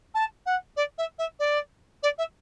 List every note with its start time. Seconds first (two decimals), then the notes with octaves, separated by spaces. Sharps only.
0.14 A5
0.45 F#5
0.76 D5
0.97 E5
1.18 E5
1.39 D5
2.02 D5
2.18 E5